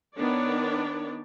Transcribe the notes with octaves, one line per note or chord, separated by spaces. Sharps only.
D#3 B3 D4 C#5 D5